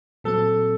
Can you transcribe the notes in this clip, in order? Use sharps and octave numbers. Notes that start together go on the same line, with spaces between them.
A#2 F#3 C4 A4